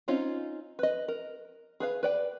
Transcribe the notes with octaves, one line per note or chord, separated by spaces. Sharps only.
C4 C#4 D#4 F4
B4 D#5
A#4
G#4 B4 F5
B4 D5 G5